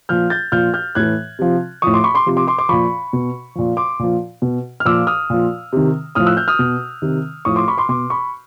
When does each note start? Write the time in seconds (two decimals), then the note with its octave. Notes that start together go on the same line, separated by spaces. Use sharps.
0.09 A#2 F3 F6 G6
0.30 G6 A6
0.52 A#2 F3 F6 G6
0.74 F6 G6
0.95 A2 E3 F#6 G#6
1.39 C3 F3
1.82 A2 F3 C#6 D#6
1.94 C6 D6
2.04 B5 C#6
2.15 C6 D6
2.26 C3 F3
2.37 C6 D6
2.48 C6 D6
2.59 C6 D6
2.69 A#2 F3 B5 C#6
3.13 B2
3.55 A#2 F3
3.77 C6 D6
3.99 A#2 F3
4.42 B2
4.80 F6
4.85 A#2 F3 D6 E6
5.07 D#6 F6
5.30 A#2 F3
5.73 C3 D#3
6.15 A2 F3 D#6 F6
6.26 E6 F#6
6.37 F6 G6
6.48 D#6 F6
6.59 B2
7.02 C3 D#3
7.45 A2 F3 C#6 D#6
7.56 C6 D6
7.68 B5 C#6
7.78 C6 D6
7.89 B2 C6 D6
8.10 B5 C#6